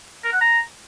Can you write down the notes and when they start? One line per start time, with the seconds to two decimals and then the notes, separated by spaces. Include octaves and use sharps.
0.24 A#4
0.32 F#5
0.41 A#5